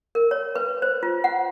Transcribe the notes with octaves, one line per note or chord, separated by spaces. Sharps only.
A#4
C#5
B4
C5
F4
F#5